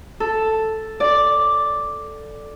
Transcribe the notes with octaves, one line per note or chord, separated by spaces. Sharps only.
A4
D5